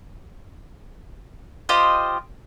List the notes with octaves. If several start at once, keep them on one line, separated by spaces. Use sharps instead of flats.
F4 G4 C5 D#5